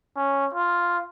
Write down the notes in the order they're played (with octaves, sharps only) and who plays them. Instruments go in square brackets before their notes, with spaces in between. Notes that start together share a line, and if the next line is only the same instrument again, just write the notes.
[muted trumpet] C#4
F4